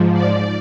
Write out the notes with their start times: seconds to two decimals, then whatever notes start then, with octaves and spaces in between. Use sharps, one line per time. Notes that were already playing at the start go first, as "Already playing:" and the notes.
Already playing: G#2 F3
0.13 D5